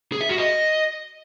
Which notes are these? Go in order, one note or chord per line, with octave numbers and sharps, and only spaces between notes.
G#4
E5
F#4
D#5